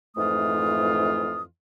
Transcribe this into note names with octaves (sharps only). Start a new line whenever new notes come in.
F2 G#2 E3 A3 F4 D#6